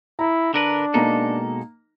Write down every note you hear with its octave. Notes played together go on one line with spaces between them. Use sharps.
E4 A#5
D3 D4 A#4 B4
B2 G#3 A#3 D#4 A4 A#5